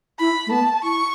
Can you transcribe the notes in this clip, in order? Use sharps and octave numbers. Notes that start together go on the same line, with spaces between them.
E4 B5
A3
B3 A5
E4 C#6